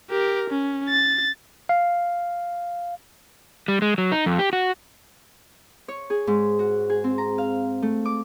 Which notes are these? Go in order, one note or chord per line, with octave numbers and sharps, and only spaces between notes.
G4 A#4
C#4
A6
F5
G3
G#3
F#3
D#4
F2
G4
F#4
C#5
G#4
G#2
F#4
G#4
C4
A#5
F5
A3
D6